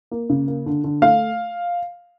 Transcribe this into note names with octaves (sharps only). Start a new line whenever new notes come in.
A#3
C#3
A#3
D3
D3
A3 F5